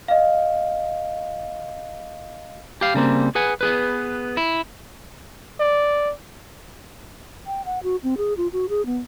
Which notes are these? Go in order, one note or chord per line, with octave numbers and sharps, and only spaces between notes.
D#5 F5
G4 F5
C#3 G3 A#3 C4
G#4 B4 F#5 G#5
B3 G#4 B4
E4
D5
G5
F#5
F#4
C4
G#4
F4
F#4
G#4
B3